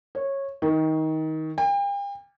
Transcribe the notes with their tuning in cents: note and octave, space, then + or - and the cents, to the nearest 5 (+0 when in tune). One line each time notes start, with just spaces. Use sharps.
C#5 -15
D#3 +20
G5 +40